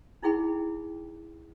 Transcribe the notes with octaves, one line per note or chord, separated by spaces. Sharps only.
D#4 E4 G#4 G5 B5